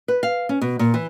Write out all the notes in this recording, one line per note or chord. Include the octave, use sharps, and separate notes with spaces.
B4
F5
C#4
B2
A#2
E3